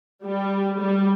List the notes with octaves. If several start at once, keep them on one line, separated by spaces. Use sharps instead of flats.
G3
G3